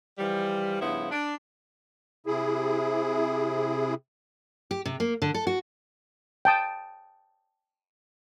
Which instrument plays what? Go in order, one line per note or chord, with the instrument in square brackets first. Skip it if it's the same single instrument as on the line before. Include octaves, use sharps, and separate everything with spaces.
[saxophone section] E3 F3 G3
G2 C#3 F3 B3 E4
D4
[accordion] C3 E4 G#4
[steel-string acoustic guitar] G4
C3
A#3
D3
A4
F#4
[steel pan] G5 A5 D#6